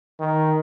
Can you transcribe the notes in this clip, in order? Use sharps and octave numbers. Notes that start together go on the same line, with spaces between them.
D#3